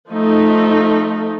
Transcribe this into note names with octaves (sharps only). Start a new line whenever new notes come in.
F3 A3 D#4